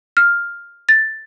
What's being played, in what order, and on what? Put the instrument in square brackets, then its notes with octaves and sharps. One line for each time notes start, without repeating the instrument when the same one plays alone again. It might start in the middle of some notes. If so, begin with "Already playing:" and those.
[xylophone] F6
A6